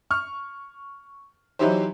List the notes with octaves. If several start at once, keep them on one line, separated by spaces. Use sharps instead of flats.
C#6 F6
E3 F#3 D#4 E4 G4 C5